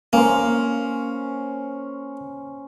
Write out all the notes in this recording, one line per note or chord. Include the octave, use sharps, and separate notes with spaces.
A#3 C#4 C5